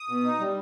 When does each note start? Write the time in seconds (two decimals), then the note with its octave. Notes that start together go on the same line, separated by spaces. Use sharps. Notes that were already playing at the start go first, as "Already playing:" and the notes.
Already playing: D#6
0.09 B2
0.24 D#4
0.40 G3